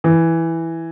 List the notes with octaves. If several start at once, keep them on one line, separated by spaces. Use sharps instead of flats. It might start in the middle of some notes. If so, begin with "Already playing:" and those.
E3